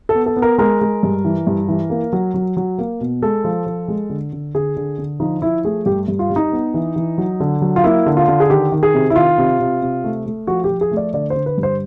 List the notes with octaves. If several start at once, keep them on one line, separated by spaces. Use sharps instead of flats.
A4
B3
A4
B3
A#4
G#3 A#4
G#3
G2
E3
G2
E3
A#3
F#3
F#3
F#3
A#3
B2
G#3 A4
F3
F3
G#3
D3
D3
D3 G#4
D3
D3
F3 D#4
F3 E4
A3 G#4
G2 G4
G2
F4
G3
D#4
B3
E3
E3
F#3
D3
F#3
F4
A#3 E4
D3
F4
D3
G#4
D#3 G4
D#3
G#4
C3
E4
D#3 F4
C3
C3
C3
A3
A3
F3 F#4
G4
F3
G#4
A3
D5
D3 D5
C5
D3
B4
G2
C5